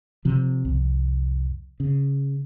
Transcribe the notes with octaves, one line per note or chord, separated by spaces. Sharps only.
C3 F3
C2 F2
C#3